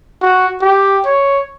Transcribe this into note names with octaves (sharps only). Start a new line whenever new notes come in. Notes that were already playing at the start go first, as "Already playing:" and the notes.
F#4
G4
C#5